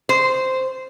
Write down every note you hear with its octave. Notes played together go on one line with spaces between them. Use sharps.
C5